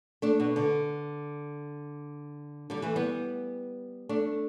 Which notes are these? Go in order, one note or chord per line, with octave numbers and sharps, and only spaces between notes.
A3 D4
B2
D3
D3 G3
E3 A3
G3 B3
A3 D4